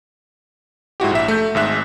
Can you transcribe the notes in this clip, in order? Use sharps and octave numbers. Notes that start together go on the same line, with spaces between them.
G#2 E4 F#4 G4
A#1 E5
A3 G6
G#1 G#2 E5 F#6